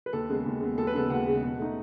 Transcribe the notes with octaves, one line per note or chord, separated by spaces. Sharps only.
B4
D#2 A4
C#3 G#3 B3
D#2
C#3 G#3 B3
D#2 A4
B4
C#3 G#3 B3 A4
D#2 F#5
C#3 G#3 B3
B2
A3 D#4